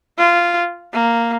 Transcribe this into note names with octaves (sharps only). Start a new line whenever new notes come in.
F4
A#3